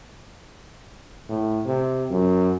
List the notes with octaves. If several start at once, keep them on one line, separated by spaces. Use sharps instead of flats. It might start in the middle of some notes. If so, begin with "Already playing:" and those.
A2
C3
F#2